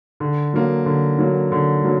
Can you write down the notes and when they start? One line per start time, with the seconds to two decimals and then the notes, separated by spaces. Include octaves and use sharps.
0.20 D3
0.54 F#3 A#3
0.86 D3
1.19 F#3 A#3
1.52 D3
1.84 F#3 A#3